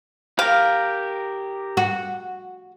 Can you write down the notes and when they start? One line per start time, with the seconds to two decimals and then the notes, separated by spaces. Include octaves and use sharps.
0.39 G4 A#4 F5
1.77 F#4